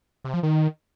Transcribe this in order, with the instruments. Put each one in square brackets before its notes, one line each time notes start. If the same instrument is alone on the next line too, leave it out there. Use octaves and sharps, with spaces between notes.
[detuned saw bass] C3
F3
D#3